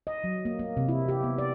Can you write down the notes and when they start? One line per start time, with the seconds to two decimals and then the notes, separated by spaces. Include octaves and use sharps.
0.07 D#5
0.24 F#3
0.45 A#3
0.59 A#3
0.77 C3
0.88 E4
1.09 G4
1.23 B3
1.38 D5